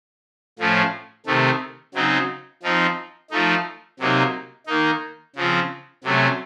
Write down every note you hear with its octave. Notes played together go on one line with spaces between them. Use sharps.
A2 F3 A3 C#4
C3 D#3 A3
C#3 F#3 C4 D#4
F3 C4 D#4
F3 A3 D#4
C3 F#3 A#3 D#4
D#3 A#3 D#4
C#3 F3 C4
C3 F#3 A3 C#4